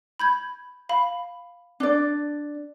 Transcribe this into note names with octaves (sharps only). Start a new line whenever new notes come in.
B5 G6 G#6
F5 B5
D4 D5